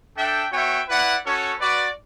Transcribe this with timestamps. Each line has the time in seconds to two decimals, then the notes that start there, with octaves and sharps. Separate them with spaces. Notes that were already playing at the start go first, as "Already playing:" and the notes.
0.16 D4 A4 E5 G5
0.52 B3 F#4 C#5 E5 G5
0.88 E4 B4 D5 F#5
1.24 C#4 F#4 A4 C#5
1.59 F#4 B4 D5